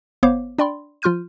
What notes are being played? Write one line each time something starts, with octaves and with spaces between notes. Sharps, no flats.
G1 B3 C5 C#5 F5 D6
D4 D5 G5 B5 C6
F3 F4 C6 F6 G6 D#7